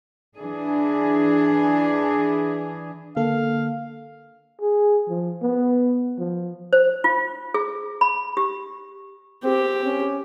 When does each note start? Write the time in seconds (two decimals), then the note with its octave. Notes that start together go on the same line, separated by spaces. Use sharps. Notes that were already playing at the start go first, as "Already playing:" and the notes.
0.37 E3 D4 G#4
3.16 D3 A#3 A4 F5
4.61 G#4
5.08 F3
5.42 B3
6.18 F3
6.73 C5
7.04 F4
7.54 G#4
8.01 B5
8.37 G4
9.44 C4 G4
9.85 C#4